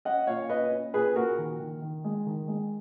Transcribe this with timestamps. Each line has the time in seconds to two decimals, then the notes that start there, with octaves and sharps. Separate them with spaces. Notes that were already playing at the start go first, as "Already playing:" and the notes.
0.05 C#4 D#5 F#5
0.27 A#2 C#5 F5
0.50 C#4 B4 D#5
0.72 C#4
0.93 A#2 G#4 B4
1.16 A#2 F#4 A#4
1.38 D#3
1.60 D#3
1.82 D#3
2.04 G#3
2.26 D#3
2.48 G#3